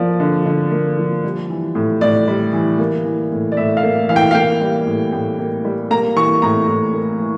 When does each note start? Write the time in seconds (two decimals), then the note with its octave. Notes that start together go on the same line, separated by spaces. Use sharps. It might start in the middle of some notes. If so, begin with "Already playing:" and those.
Already playing: F3 A#3 D5
0.20 D3
0.46 D3
0.72 A#3
0.98 F3
1.24 G3
1.50 E3
1.75 A2
2.01 A2 D5
2.28 G3
2.53 E3
2.79 A#3
3.05 E3
3.32 A2
3.52 D5
3.57 A2 E5
3.77 F5
3.83 A#3
4.09 E3 F5
4.16 G5
4.31 F5
4.35 A#3 G5
4.61 G3
4.87 A2
5.12 A2 G5
5.39 A#3
5.65 G3
5.91 A#3 A#5
6.16 E3 C#6
6.42 A2 A#5
6.68 A2
6.94 A#3
7.19 E3